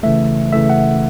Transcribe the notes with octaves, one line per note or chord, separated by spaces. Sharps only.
C#3 E3 A3 E5
C#3 E3 A3 E5
F#5